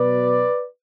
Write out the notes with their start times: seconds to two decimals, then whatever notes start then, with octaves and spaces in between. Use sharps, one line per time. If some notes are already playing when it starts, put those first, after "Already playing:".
Already playing: B2 F#3 B4 D5